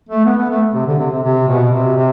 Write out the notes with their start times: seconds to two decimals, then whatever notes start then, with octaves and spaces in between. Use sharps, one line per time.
0.09 A3
0.25 B3
0.37 B3
0.49 A3
0.74 C3
0.86 D3
0.98 C3
1.11 C3
1.23 C3
1.47 B2
1.72 C3
1.96 C3